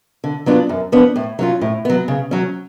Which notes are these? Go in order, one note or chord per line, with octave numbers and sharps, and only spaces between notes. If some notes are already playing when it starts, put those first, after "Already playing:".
D3
F#3 B3 D4 F4
F#2
F3 B3 D4
A2
F#3 C#4 F4
A2
F#3 B3
C#3
F#3 C#4